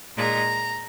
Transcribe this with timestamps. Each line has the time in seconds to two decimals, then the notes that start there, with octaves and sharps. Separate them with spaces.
0.17 A#2 G#3 D#4 A#5